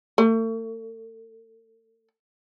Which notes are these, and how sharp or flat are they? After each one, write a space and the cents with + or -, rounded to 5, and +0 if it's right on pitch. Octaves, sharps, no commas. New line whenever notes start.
A3 +40